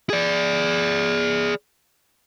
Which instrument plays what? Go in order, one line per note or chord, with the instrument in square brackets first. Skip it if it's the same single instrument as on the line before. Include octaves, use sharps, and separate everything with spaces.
[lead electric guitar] G#4 D5